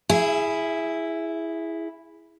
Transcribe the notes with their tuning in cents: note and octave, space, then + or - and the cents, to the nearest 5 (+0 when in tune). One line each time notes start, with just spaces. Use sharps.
E4 +0 G#4 +0 E5 +40